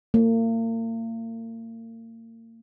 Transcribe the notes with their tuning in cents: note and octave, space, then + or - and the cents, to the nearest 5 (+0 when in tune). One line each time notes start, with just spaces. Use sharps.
A#3 -40